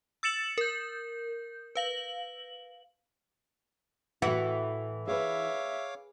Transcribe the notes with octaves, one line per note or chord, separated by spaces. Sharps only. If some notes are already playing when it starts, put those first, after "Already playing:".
E6 A6 C#7 E7 F#7
A#4 G6
B4 F5 F#7
A2 E3 A3 F#4
G#4 B4 C#5 E5 F5 D6